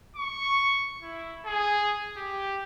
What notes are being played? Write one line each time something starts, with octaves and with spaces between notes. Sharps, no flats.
C#6
E4
G#4
G4